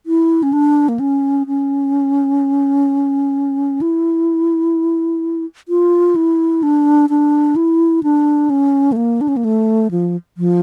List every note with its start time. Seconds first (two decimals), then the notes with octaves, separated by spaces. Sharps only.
0.06 E4
0.43 C#4
0.53 D4
0.89 A#3
1.00 C#4
1.47 C#4
3.81 E4
5.68 F4
6.16 E4
6.63 D4
7.10 D4
7.56 E4
8.03 D4
8.50 C#4
8.92 A3
8.96 A#3
9.21 D4
9.28 C#4
9.37 A#3
9.45 A3
9.91 F3
10.37 F3